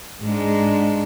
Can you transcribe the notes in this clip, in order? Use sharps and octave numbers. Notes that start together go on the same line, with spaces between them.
G#2 G#3 D4